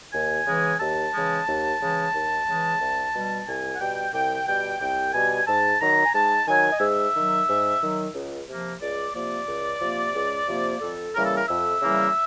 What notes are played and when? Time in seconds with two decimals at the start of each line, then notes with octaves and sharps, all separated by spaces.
0.13 D#2 G#5
0.46 C#3 E3 G#3
0.80 D#2 A5
1.14 C#3 E3 G#3
1.47 D#2
1.81 C#3 E3 G#3
2.14 D#2
2.47 C#3 E3 G#3
2.80 C2
3.14 B2 G3
3.47 C2 G#5
3.74 F#5
3.80 B2 G3 G5
4.13 C2 G5
4.47 B2 G3 G5
4.81 C2 G5
5.13 B2 G3 G#5
5.47 G#2 A5
5.81 D#3 F#3 A#5
6.06 G#5
6.14 G#2 A5
6.47 D#3 F#3 G#5
6.71 D#5
6.80 G#2 E5
7.14 D#3 F#3
7.48 G#2
7.81 D#3 F#3
8.14 C#2
8.48 C3 F3 A#3
8.81 C#2 D5
9.14 C3 F3 A#3 D5
9.47 C#2
9.81 C3 F3 A#3
10.14 C#2
10.48 C3 F3 A#3
10.81 F2 A4
11.15 C#3 E3 G3 A#3 A#4
11.25 A4
11.36 A#4
11.48 F2 E5
11.81 C#3 E3 G3 A#3